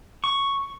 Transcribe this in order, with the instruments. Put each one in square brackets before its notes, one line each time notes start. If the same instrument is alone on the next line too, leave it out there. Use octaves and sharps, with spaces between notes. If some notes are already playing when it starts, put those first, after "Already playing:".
[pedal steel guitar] C#6